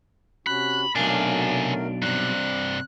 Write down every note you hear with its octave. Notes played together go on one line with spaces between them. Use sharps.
C3 C#4 F#4 B5 F#6
B1 C3 F#3 A3 D4 A#4 F5 G#5
G2 C3 C4 D5 F#6